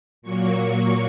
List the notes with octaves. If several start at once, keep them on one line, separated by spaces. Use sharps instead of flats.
A#2 F#3 A#3 C#6